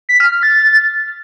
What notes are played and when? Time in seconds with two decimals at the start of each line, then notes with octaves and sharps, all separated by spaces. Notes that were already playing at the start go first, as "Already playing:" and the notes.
0.09 B6
0.20 F6
0.32 F6
0.43 A6